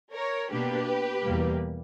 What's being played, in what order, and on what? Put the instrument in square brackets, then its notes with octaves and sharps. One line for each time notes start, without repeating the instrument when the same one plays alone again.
[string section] A#4 C#5
B2 A#3 D4 G4 B4
E2 B2 G3 A#3